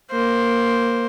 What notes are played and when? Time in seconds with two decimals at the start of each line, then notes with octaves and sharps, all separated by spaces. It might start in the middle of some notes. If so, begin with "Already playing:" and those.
0.11 A#3 C5